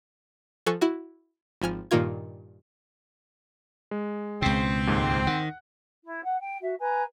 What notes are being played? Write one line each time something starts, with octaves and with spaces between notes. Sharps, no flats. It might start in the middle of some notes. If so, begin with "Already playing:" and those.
F3 A4 G#5 C#6 F#6
E4 F#4
G#1 F3 G#5 F6
G2 A#2 D#3 A#3 F4 G#6
G#3
C#2 B2 C4
D#2 G#2
D#3 F#5
E4
F#5
G5
F#4 E5
B4 G#5 A#5